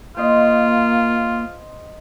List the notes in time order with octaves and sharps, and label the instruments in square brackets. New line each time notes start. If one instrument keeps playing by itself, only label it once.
[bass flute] A#3 [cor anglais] F4 [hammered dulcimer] C5 D#5